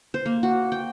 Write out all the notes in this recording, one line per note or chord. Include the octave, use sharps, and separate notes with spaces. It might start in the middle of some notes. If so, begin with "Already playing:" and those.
C5
A#3
F#4
G5